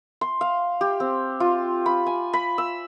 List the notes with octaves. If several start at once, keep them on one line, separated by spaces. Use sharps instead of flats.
C6
F5
G4
C4
F4
B5
G#5
B5
E6